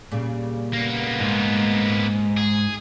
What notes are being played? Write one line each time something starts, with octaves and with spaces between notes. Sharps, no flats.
A#2 C#3 G3
A#3 B3
G#2
G#4